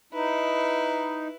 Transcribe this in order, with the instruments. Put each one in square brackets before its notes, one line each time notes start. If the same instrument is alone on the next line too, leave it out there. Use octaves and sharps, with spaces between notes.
[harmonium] D#4 [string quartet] E4 B4